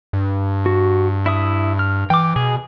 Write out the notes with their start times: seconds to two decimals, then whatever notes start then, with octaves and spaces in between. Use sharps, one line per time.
0.13 G2
0.66 F#4
1.26 E4 E5 D#6
1.79 F6
2.10 E3 G5 D6
2.36 B2 G#4